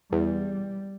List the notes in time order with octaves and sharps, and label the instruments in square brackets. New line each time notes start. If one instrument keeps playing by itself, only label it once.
[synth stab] E2 [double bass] G3